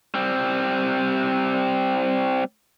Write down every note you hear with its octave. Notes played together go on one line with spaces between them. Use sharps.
G3 C4